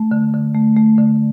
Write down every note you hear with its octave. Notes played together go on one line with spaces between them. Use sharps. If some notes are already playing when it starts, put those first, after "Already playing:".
Already playing: A3
D3
D3
A3
A3
D3